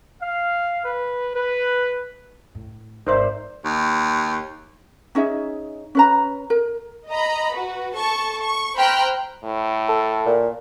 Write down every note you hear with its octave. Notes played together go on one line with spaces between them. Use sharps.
F5
B4
B4
A2
G#1 D#4 A#4 C5 D5 E5
D#2
C#4 D#4 G#4 E5
C#4 B4 A#5
A#4
D#5 A#5 B5
F#4 B4
A4 A5 C#6
C#6
C5 G5 A#5 B5 F6 F#6
A2
A4
A#2